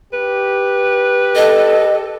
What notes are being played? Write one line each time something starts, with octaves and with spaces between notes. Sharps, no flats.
G4 B4
A4 D#5